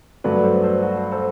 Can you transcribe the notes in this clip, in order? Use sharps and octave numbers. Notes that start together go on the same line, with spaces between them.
G2 F#3 A3 B4 D5
A4 C5
A4 C5
F#4 A4
A4 C5